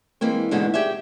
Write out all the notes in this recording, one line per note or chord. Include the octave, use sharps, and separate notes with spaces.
E3 G#3 A#3 C4
E2 B2 D3 G#3 D#4
G4 G#4 D5 E5